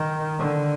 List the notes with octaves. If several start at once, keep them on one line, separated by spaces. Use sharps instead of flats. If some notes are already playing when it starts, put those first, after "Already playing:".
Already playing: D#3
D3